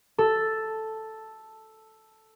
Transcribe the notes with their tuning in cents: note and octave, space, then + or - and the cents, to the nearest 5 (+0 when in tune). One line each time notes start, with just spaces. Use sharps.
A4 +0